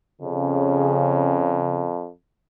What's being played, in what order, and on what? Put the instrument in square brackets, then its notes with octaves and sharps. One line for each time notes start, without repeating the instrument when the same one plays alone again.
[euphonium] F2 [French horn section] C#3